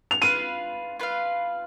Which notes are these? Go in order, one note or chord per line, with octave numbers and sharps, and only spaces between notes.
F7
F4 B4 F5 D#7
F4 B4 F5